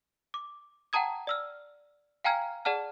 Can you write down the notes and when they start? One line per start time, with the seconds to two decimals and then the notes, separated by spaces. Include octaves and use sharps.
0.34 D6
0.93 F#5 G5 A5 A#5 D#6 G#6
1.27 D5 E6 F6
2.24 F5 G5 G#5 A#5 F6 G#6
2.65 G#4 D5 F#5 A5 F6